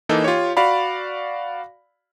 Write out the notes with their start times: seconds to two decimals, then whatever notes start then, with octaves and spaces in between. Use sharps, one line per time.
0.09 E3 A#3 D#4 A4
0.24 F4 G4 C#5
0.57 F#4 D5 F5 B5